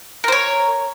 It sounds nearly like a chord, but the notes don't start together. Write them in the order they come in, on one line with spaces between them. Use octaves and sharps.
A#4 C5 C#5